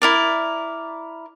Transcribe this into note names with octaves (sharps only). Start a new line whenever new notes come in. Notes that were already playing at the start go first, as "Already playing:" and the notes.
E4 A#4 D5